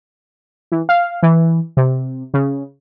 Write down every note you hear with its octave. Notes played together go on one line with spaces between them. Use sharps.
E3
F5
E3
C3
C#3